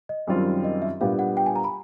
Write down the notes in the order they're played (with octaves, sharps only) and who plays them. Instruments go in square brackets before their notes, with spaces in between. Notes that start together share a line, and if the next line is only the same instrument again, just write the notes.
[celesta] D#5
[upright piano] F#2 D#3 G3 C4 F4
[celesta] D#5
E5
[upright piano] A#2 G3 B3 D4 G4 [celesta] F5
[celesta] F#5
G5
G#5
A#5
B5